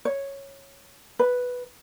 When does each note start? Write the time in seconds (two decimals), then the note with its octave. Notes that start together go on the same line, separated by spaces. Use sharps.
0.05 C#5
1.19 B4